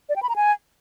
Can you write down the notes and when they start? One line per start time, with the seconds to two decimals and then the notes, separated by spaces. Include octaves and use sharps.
0.09 D5
0.16 G5
0.23 B5
0.29 A#5
0.36 G#5